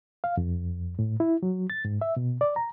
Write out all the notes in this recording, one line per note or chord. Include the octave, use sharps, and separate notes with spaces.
F5
F2
A2
E4
F#3
A6
G#2
E5
B2
D5
A#5